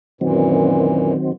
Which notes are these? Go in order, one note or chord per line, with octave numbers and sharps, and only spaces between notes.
F#2 A#2 D#3 E3 F#3 C4